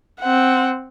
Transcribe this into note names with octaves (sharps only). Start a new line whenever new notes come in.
C4 F#5